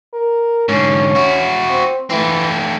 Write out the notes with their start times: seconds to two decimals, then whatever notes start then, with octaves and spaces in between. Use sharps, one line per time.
0.13 A#4
0.69 G#2 D3 C#4
1.15 E4 F#4
1.70 C4
2.10 E3 A3 C4